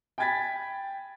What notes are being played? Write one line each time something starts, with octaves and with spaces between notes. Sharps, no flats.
G5 G#5 B5 G#6 A6 B6